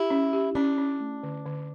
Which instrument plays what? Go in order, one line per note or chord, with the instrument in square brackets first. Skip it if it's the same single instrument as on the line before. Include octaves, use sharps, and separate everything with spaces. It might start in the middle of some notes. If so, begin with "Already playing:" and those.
Already playing: [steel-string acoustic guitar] E4 [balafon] G4
[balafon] C#4
G4
[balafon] C#4 [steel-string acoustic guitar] D4
[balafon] C#4
A3
D3
D3